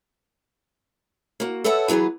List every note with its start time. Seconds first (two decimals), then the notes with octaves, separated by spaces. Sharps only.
1.40 A#3 F#4
1.64 A4 B4 C#5 E5 F#5 A5
1.88 E3 F#3 B3 G#4 B4